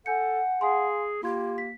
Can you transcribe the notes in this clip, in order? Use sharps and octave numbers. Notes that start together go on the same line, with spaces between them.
A4 F#5 G#5 G6 C#7
G#4 F5 G#5 C6
A#3 F4 G4 C6 G#6
B6